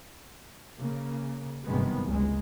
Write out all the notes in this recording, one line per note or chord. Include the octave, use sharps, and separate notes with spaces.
C#3 A#3
F#1 G2 C3 D#3 G#3 B3
F#1 C#2 G#3